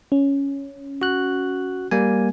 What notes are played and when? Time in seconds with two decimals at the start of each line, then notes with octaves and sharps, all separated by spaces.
0.12 C#4
1.02 F#4 F#6
1.91 G3 A#3 G#5